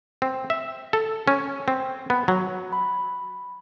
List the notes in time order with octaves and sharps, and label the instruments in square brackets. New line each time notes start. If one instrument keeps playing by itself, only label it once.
[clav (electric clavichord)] C4
E5
A4
C#4
C4
B3
F#3
[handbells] B5